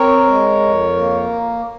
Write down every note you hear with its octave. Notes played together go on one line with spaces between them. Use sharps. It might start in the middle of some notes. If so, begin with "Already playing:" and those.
Already playing: C4 A#4 C#5
G#3
F2
A#3